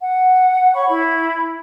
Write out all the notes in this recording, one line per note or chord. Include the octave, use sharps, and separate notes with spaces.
F#5
C#5 B5 C#6
E4 B5